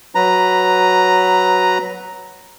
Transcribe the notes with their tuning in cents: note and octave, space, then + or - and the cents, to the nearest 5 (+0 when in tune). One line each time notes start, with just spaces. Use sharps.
F#3 +0 B4 +0 A#5 +0